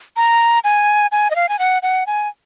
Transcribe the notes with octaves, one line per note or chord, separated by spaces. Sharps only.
A#5
G#5
G#5
D#5
F5
G#5
F#5
F#5
G#5